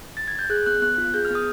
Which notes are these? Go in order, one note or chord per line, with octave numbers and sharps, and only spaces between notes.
A6
G#6
G6
G#4 F#6
B3 F#6
B3 F#6
F4
G#4 G6
F6
B3 D#6